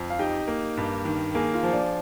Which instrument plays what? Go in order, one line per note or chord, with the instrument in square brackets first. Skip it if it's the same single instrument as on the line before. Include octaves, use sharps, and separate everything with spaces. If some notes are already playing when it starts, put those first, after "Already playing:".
Already playing: [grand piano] F2
[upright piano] F5
[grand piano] D#4 [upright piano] G4 G5
[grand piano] A#3
G2
D#3
[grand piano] A#3 [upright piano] G#4 G#5
[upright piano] F4 F5
[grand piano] F3
[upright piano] D4 D5